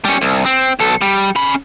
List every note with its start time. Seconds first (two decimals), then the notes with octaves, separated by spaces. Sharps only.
0.05 G3 C#4
0.22 C2
0.46 C4
0.79 B1 A4
1.01 G3
1.36 C#4 B5